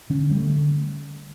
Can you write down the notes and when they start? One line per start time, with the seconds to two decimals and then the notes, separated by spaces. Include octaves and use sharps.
0.10 D3 C#4
0.30 D3 G3
0.36 A3
0.49 D3